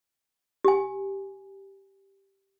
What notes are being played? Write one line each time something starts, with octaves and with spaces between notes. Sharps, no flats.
G4 G#5